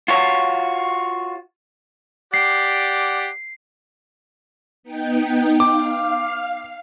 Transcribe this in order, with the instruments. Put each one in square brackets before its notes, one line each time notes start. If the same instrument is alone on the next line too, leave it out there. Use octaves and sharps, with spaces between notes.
[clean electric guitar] F4 F#4 C#5
[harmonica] G4 D5 F#5 [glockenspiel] C7
[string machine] B3 D#4 G5
[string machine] F5 [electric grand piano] D6